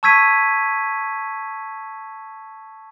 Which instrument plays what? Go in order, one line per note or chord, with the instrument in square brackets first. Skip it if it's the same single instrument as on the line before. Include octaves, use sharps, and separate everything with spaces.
[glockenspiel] A5 C#6 E6 G#6 B6 D#7